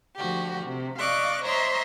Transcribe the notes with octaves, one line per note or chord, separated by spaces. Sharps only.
D2 F3 F#4 G4
C3
D5 D#5 F5 C#6 D6 F#6
C5 C#5 D#5 E5 A#5 C6